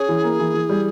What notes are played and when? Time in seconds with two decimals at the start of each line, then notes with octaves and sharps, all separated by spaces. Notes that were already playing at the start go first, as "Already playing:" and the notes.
Already playing: C#4 G#4
0.09 E3
0.24 A#3
0.39 E3
0.54 E3
0.69 G3